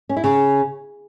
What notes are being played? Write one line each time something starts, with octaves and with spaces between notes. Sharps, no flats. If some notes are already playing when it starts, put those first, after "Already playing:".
C#4
E4
C#3